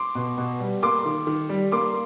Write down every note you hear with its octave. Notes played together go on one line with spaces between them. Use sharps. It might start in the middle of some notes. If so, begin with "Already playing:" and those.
Already playing: C6 D6
B2
B2
G3
A#3 C6 D6
D#3
D#3
G3
A#3 C6 D6